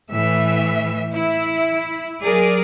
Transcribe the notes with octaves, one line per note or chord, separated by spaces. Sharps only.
A2 E3 E5
E4
F#3 G#4 A#4 D5